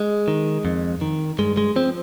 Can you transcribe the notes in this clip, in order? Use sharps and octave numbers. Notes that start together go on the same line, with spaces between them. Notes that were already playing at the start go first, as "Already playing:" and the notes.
Already playing: G#3
D#3
F2
D#3
G2 G#3
G#3
F3 C4